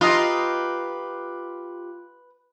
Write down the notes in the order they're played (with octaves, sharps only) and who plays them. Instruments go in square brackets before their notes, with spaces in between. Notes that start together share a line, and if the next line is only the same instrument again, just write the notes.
[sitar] F4 G4 [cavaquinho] B4 D#5 A#5